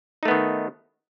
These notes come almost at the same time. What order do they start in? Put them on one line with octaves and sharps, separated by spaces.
D#4 A3 B3 D#3